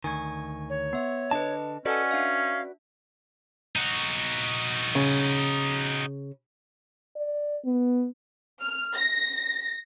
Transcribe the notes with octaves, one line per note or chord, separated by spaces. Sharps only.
D2 D#3 G#5 C#6 G#6
C#5
B3 E5
D3 D4 B4 D#5 A5
C#4 F#4 A4 B4 D5 D#5 F#5 G#5
D4 E5 F5
D#4 F#4
C#3
D5
B3
F6
A#6